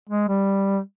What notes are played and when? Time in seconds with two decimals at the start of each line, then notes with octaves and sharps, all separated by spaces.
0.09 G#3
0.28 G3